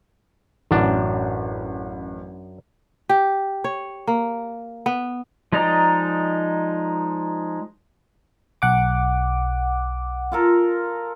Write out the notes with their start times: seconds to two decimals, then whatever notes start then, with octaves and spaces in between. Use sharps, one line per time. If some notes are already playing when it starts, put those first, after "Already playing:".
0.71 A1 F#2 D4
3.09 G4
3.64 C#5
4.07 A#3
4.86 B3
5.52 F3 G#3 D#4 D5 A#5
8.62 B1 F#5 D6
10.32 F4 A4 A#4